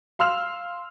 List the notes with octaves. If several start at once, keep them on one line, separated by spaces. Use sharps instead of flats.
F5 C6 E6 F6 F7